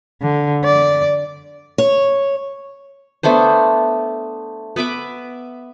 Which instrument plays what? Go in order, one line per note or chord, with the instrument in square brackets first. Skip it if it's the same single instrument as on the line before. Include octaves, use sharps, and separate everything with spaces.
[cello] D3
D5
[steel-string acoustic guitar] C#5
[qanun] A3 B3 D4 C5
B3 B4 E5 D6